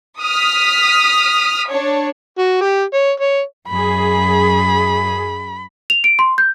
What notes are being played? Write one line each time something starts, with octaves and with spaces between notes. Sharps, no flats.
D#6 F6 B6
D4 C#5
F#4
G4
C#5
C#5
F#2 G#4 B5
F7
D7
C6
G6